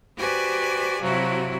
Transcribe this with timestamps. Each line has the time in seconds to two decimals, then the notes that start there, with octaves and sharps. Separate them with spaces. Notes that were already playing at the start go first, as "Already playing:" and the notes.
0.16 F#4 G4 B4 C5 D5 G#5
1.00 C3 F3 F#3 E4 F#4